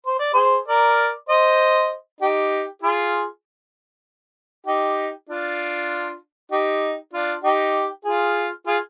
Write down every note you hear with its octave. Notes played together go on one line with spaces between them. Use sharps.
C5
D5
G#4 C5
A#4 D5
C5 D#5
D#4 G4
F4 G#4
D#4 G4
D4 F4
D#4 G4
D4 F4
D#4 G4
F4 G#4
F4 G#4